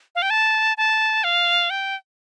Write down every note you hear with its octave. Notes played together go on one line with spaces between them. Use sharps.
F5
G5
A5
A5
F5
G5